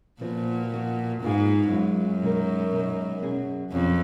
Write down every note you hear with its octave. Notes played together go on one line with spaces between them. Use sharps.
A#2 F3 B3 F#4
F3 B3 F#4
G#2 G#3 B3 F4 G#4
F#2 G#3 B3 F4 G#4
B2 G#3 D#4 A#4
B2 G#3 D#4 A#4
B2 F#3 C#4 G#4
F2 B2 F#3 C#4 G#4